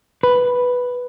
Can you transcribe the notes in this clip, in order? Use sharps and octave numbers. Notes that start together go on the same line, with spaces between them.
B4